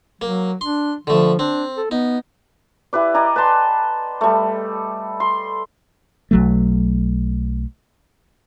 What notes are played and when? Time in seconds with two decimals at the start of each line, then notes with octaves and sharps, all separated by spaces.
0.21 F#3 A#3
0.61 D4 C6
1.07 D3 F3 A3
1.39 C4 D4
1.77 A4
1.91 B3 D#4
2.93 E4 G4 B4 D5
3.14 D5 D#5 G#5 A#5
3.36 B4 G5 A5 C6
4.21 G3 A3
5.20 C6
6.31 B1 F#3 A3